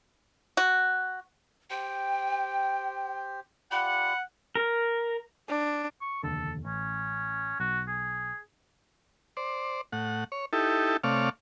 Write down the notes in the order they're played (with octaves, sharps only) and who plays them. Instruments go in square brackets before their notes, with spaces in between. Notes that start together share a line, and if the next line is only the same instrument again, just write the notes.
[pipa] F#4
[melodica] G4 C5 [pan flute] G5
[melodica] F4 G4 D5 [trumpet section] F#5 [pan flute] B5
[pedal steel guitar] A#4
[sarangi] D4
[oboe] C#6
[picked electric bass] F1 D#2 D3 [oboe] A4
[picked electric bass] A1 [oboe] C#4
[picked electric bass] B1 [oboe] F#4
[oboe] G#4
[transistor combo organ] C5 D5
A2 F#5
C#5
D#4 E4 G4 A4
C3 A3 C#5 D5 F5